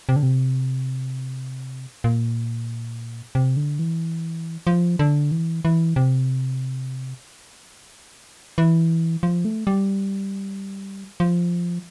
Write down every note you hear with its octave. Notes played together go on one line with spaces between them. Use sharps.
C3
D3
C3
A#2
C3
D3
E3
F3
D3
E3
E3
C3
E3
F3
A3
G3
F3